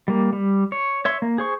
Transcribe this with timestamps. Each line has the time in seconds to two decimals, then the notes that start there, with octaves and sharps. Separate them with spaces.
0.08 G3 A#3
0.33 G3
0.72 C#5
1.05 C#5 E5 C6
1.22 A#3
1.38 G#4 C5 C#6